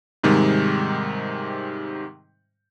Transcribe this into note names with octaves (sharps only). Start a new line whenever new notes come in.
G#2 C3 D#3 G3 G#3